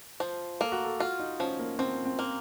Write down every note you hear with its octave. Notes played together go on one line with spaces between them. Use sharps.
F3 C5
A#3 A4
F#4
A4
F4 F#4
D#4
F3 C#4
A#3
F3 C4
C4
A#3